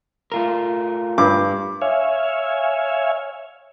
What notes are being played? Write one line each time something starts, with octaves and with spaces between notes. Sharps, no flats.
A3 F4 A#4
G2 D6
C#5 E5 F5 G#5